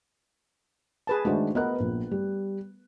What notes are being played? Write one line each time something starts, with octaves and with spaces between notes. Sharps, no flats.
G#4 B4 A5
D#3 G#3 A3 D4 F#4 C5
B3 A#4 B4 D#5 F#6
A#1
G3